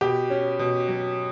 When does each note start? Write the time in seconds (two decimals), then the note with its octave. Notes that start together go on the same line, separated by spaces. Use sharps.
0.01 B2 G4
0.30 C#4
0.59 B2
0.88 F#3